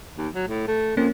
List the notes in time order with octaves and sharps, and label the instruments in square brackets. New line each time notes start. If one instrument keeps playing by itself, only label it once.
[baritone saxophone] D#2
F#3
A2
A3
[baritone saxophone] F2 [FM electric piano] A#3 C#4